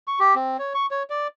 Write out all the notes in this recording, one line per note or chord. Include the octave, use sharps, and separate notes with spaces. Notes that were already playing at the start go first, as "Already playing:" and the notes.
C#6
G4
C4
C#5
C#6
C#5
D5